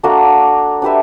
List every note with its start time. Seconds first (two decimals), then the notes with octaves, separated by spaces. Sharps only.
0.03 A#3 D4 F#4 A4
0.82 D4 G4 B4 E5